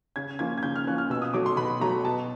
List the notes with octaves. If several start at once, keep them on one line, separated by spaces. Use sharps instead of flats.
C#3 G#6
F3 A#3 C#4 G#6
G#6
C#3 G6
F6
F3 A#3 C#4 F#6
F6
B2 E6
D#6
F#3 A3 D6
C6
B2 B5
F#3 A3 A#5
B2 A5